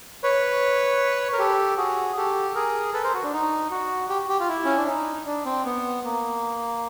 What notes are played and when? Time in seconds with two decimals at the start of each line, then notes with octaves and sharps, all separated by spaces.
0.24 B4 C#5
1.33 A#4
1.39 G4 A4
1.77 F#4 G#4
2.17 G4 A4
2.55 G#4 A#4
2.93 A4 B4
3.03 A#4 C5
3.14 F#4
3.24 D4
3.33 D#4
3.71 F#4
4.10 G4
4.29 G4
4.40 F4
4.49 E4
4.65 C#4
4.77 D4
4.88 D#4
5.26 D4
5.45 C4
5.65 B3
6.04 A#3